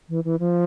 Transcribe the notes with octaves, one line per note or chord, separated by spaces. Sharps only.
E3
E3
F3